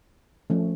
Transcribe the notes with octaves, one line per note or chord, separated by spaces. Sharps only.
F3 A3 C#4